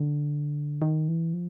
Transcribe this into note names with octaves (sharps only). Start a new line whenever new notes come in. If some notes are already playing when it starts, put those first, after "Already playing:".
Already playing: D3
D#3
E3
F3